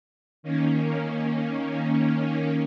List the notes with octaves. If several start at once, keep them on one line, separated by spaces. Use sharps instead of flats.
D#3 A#3 C#4